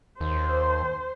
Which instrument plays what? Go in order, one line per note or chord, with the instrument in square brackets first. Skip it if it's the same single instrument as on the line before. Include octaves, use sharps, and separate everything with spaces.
[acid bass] D#2 [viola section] C5